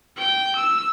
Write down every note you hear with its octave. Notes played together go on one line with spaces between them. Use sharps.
G5
E6